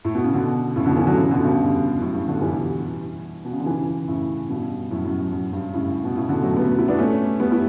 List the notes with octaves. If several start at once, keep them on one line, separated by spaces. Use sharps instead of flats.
A2
B2
C#3
B2 D3
A2 C#3
B2 D3
C#3 E3
D3 F#3
A2 C#3
B2 D3
G2 B2
F#2 A2
G2
B2 D3
E3 G3
B2
C#3
D3
C#3 E3
A2 C#3
G2 B2
F#2 A2
F#2
F#2
F#2
G2
A2 C#3
B2
A2 C#3
B2 D3
F#3 A3
G3 B3
E4
B3 D4
A3 C#4
G3 B3
E4